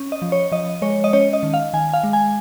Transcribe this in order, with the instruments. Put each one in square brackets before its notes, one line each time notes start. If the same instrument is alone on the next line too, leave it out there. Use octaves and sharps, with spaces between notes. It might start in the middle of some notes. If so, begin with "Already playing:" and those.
Already playing: [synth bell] C#4
D#5
F3
C#5
F3 D#5
G#3 C#5
D#5
C#4 C#5
D#5
D#3
F5
D#3 G#5
F5
G#3
G#5